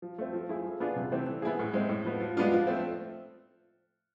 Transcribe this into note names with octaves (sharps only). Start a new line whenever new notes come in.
F3
A3 C4
F3
A3 E4 G#4
F3
B3 D4 F4 G#4
C3
E3 A3 C4
E3
B3 E4 G#4
A2
G#3 C4
A2
F3 B3
F3
G#3 B3 D4 F4
F3
A3 C4